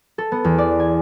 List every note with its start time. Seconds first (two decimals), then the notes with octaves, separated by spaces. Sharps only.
0.18 A4
0.32 B3
0.44 E2
0.58 D5
0.79 G#5